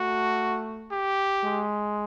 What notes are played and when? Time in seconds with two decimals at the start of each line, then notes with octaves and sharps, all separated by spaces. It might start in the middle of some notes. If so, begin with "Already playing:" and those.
Already playing: A3 F#4
0.91 G4
1.44 G#3